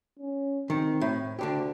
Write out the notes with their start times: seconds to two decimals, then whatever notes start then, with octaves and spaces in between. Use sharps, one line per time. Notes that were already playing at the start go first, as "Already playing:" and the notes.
0.19 C#4
0.70 D#3 C4
1.01 A2
1.39 D2 D3 D4 G4